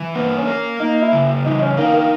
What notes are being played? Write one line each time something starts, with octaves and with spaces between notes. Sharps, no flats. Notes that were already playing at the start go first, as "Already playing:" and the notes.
Already playing: E3
A#3 B3
C#4
A#4
A#3 D#4
E4
C#3
E3 D#4
C#4
A#3 D#4
A#3